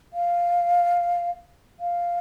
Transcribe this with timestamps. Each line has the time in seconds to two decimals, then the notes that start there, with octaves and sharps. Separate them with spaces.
0.13 F5
1.80 F5